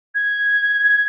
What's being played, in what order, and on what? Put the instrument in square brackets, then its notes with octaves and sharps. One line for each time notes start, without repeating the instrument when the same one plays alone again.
[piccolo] G#6